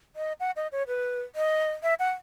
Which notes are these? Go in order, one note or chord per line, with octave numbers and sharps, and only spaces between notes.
D#5
F#5
D#5
C#5
B4
D#5
E5
F#5